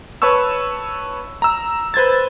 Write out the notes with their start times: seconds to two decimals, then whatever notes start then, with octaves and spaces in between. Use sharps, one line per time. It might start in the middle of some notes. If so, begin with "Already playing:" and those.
0.22 B4 C#5 A5 C#6 E6
1.42 A#5 E6
1.94 B4 C5 G#6 A6